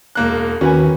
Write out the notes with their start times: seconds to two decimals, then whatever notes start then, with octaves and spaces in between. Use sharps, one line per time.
0.15 E1 A#3 F#6
0.61 D#2 C#4 F#4 B4 G#5